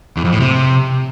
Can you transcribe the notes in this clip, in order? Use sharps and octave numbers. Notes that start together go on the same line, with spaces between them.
E2
F2
A2
C3